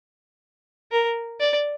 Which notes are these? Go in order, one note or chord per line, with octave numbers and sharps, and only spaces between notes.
A#4
D5